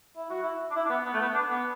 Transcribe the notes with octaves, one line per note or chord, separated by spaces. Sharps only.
E4
F#4
E4
D4
E4
D4
B3
B3
A3
B3
D4
B3